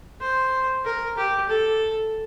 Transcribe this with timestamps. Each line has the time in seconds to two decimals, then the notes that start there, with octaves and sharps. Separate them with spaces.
0.21 C5
0.85 A#4
1.17 G4
1.48 A4